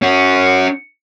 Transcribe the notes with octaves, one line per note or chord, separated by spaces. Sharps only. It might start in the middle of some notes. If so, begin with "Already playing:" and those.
C#4 F#4